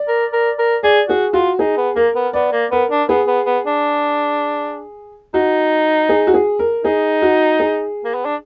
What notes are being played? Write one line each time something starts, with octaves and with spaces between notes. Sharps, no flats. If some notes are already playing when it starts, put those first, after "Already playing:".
Already playing: D5
A#4
A#4
A#4
G#4 D5
F#4 G#4
F4 F#4
D#4 G#4
B3
A#3 A#4
B3
B3 D5
A#3
B3 A#4
D4
B3 G#4
B3
B3
D4
D#4 F#4
G#4
F#4
G#4
A#4
D#4 G#4
F#4
G#4
A#3
B3
D4